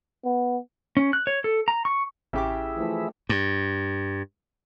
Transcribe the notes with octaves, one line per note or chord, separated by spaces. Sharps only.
B3
C#4
F#6
C#5
A4
A#5
C#6
A1 C#3 E4 G4 G#4 E5 D6
E3 F3 A3
G2